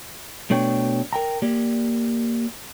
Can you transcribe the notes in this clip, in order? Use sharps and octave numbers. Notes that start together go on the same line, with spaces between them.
B2 A3 D4 C#5 G5
A#4 G5 A#5
A#3 G4 D5